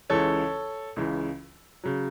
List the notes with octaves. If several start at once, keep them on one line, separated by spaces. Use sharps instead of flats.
C#2 C#3 E3 A4 C#5
C#2 C#3 E3
C#3 F#3